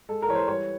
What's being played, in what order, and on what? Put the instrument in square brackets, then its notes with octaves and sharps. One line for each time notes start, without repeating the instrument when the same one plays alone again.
[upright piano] G#3 A4
A#4
E3 C#5
C5
G3 C#5